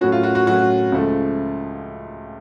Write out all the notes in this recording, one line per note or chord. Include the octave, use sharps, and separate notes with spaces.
A2 F#3 C#4 F#4
F4
F#4
F#4
A2 F#3 C#4 F#4
C#2 C#3 F3 A3